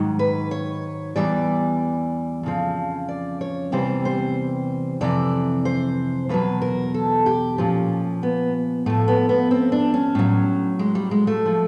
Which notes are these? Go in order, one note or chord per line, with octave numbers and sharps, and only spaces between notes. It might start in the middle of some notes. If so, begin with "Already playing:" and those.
Already playing: G#2 D#3 F#3
B4
C#5
E2 C3 E3 G3 D5
F2 C#3 F3
D5
C#5
E2 C3 E3 G3 C5
C5
F2 C3 E3 D5
C5
E2 B2 F#3 B4
A#4
A4
G4
A#2 F3 C#4
B3
A2 F3 A3
B3
B3
C4
D4
C#4
A2 F#3
G#3
G3
G#3
A3
F3